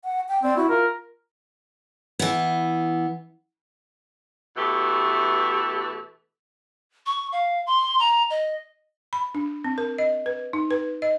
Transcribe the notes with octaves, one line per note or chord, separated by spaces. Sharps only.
F#5
G5
C4 D5
E4 F#4
F4 A#4
E3 B3
B2 E3 A3 G4
C#6
F5
C6
A#5
D#5
B5
D4
C4
A#4
D#5
B4
D#4
B4
D#5